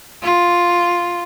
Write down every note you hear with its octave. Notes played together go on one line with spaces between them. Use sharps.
F4